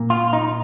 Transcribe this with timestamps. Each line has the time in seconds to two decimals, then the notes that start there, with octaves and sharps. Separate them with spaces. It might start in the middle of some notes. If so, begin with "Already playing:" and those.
Already playing: A#2 A#3
0.10 F4
0.33 D#4